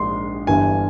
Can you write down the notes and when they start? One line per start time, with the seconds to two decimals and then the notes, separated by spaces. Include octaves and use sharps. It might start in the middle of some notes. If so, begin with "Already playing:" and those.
Already playing: A#1 G#2 C6
0.47 G1 G2 E3 G#5